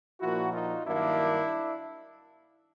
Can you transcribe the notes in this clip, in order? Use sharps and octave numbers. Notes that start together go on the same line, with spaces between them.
A#2 F3 A#3 E4 F#4
D#4 F4
G2 D#3 F#3 A#3 D4 E4